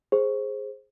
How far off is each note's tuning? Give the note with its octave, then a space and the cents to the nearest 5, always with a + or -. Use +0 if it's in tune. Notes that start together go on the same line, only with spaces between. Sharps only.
G#4 +0 C5 +15